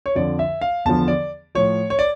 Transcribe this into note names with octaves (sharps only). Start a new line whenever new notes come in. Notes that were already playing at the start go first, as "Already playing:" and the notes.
C#5
F2 D3 F3 D5
E5
F5
E2 D3 F3 A5
D5
A2 F3 C#5
C#5
D5